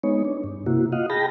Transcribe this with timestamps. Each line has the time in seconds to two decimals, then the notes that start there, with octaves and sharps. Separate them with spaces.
0.03 G#3 B3 D#4 C#5
0.25 D4
0.44 G2
0.66 C3 A#3 E4 F#4
0.92 F4 D#5 F5 F#5
1.10 G#4 G5 A5 B5 A#6